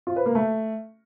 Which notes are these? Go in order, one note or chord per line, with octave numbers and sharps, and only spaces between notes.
F4
B4
A#3
A3